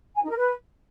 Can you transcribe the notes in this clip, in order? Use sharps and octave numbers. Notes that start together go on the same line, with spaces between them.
G#5
D#4
A#4
B4